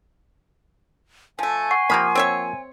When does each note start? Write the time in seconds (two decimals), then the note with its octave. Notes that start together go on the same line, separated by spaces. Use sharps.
1.39 F3 A3 G#5
1.71 F#5 C#6 C7
1.90 C3 F3 A#3 A#5 B5
2.15 C4 C#5 E5